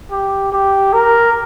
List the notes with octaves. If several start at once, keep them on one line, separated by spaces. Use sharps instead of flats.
G4
G4
A#4